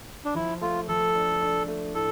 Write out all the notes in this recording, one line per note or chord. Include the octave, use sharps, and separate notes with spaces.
D4
F3 E4
A3 F4
F3 A4
D4
D4
A3
A2 A4